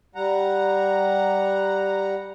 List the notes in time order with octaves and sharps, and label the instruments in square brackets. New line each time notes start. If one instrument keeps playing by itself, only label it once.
[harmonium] G3 F#5 A#5